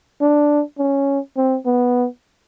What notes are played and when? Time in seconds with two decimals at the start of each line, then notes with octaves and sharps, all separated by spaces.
0.21 D4
0.78 C#4
1.37 C4
1.66 B3